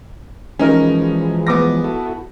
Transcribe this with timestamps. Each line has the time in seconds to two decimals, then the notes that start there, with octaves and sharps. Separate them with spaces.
0.59 E3 F3 G#3 C#4 D#4 A#4
1.47 B3 D6 A#6
1.84 E4 F#4 A4